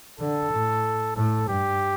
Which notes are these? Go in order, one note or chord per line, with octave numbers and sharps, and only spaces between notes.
D3 A4
A2
A2 A4
G2 G4